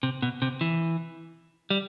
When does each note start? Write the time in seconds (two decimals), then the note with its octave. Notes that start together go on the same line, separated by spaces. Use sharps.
0.03 C3
0.22 B2
0.42 C3
0.61 E3
1.70 G3